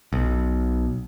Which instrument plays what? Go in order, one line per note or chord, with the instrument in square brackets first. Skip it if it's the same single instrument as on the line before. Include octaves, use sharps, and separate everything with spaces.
[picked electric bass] B1